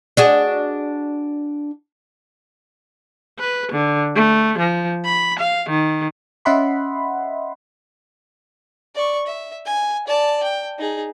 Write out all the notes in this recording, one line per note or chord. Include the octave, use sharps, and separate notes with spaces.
D4 F#4 G#4
B4
D3
A3
F3
B5
F5
D#3
C#4 D#5 E5 F#5 B5 C6
D5 C#6
E5
G#5
D5 A5
G5
D#4 G#4